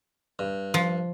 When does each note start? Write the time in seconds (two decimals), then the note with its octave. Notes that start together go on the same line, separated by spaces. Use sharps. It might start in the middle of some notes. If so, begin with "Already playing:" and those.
0.39 G2
0.74 F3